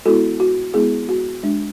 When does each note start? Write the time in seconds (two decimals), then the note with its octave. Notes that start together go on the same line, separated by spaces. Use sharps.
0.06 G#3 B3 E4 F#4 A4
0.40 F#4
0.74 G#3 B3 E4 G#4
1.09 F#4
1.43 G#3 D4